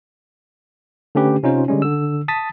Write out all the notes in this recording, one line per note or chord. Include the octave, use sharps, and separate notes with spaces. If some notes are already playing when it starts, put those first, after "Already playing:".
D3 A3 C#4 G4 B4
C3 C#4 D#4 F4 C5
D3 G3 G#3 C#4
D3 E6
A5 D#6 A6 B6